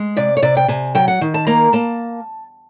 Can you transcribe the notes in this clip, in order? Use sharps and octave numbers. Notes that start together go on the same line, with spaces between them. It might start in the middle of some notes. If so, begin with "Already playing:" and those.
Already playing: G#3
C3 D5
C#5
C3 D5
G5
C3 G#5
F#3 G5
F#5
D#3
A5
A#3 A#5
A#3 A5